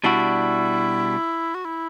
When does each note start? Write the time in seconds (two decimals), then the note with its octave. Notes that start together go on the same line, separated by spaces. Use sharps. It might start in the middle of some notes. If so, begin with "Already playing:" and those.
0.04 B2 G3 D4 E4 F#4
1.55 F#4
1.65 E4